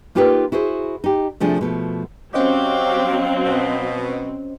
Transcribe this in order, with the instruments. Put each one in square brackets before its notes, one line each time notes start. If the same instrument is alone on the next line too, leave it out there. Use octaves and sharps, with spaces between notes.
[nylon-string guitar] A#3 D#4 F4 G4 A#4 B4
E4 F#4 G#4 C5
D#4 G4
C3 F3 A3 D4 G#4
B2 F3 A3
[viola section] F#3 C4 [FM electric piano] C#4 C5 D#5 [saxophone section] F#4 G4 [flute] F5
[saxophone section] B2